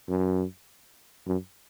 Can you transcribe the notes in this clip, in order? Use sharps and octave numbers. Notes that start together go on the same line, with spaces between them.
F#2
F#2